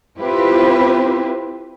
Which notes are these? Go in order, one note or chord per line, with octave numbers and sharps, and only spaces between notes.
C4 E4 F4 G4 B4 C5